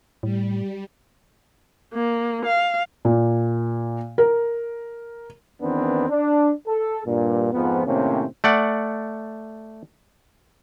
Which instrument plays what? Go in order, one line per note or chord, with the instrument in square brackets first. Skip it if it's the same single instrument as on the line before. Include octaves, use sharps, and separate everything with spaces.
[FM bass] A2 [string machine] G3
[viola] A#3
F5
[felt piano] A#2
A#4
[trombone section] E2 D#3 E3 B3 C4 D4
D4
A4
G2 A#2
F2 G#2 F3 B3
A2 C3 D#3 A#3 C4 C#4
[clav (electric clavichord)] A3 D5 F#5